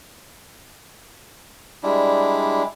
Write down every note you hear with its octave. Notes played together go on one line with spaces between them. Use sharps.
G3 G#3 D4 E4